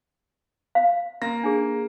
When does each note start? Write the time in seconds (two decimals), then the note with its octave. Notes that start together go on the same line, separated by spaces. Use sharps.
0.75 F5
1.22 A#3 A#6
1.44 D4 G#4